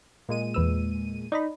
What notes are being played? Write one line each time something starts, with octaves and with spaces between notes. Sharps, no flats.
A#2 G#3 D#7
E2 B4 E6
D#4 D5 D#5 B5